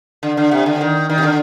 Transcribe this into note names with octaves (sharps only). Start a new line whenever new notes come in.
D3
D3
C3
D3
D#3
D#3
C3
D3